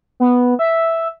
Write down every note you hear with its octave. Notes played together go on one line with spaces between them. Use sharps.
B3
E5